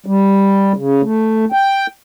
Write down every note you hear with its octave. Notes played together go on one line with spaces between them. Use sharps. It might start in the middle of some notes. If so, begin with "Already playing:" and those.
G3
C#3
A3
G5